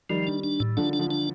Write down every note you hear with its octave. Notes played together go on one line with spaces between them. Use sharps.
D#3 F3 G3
D4
D4
A2
D3 F3 D4
D4
D3 F3
D4